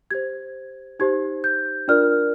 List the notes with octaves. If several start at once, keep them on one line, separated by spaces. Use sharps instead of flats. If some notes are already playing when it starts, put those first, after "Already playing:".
G4 C5 G#6
D#4 G4 C5 G#6
G6
D4 F4 A#4 D5 F6